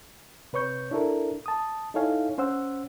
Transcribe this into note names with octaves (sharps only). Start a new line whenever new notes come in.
C3 B4 C#5 C#6 G6
D4 E4 A4 A#4
A5 D#6
D#4 E4 A4 C#5 F5 G#5
C#4 C5 F#5 E6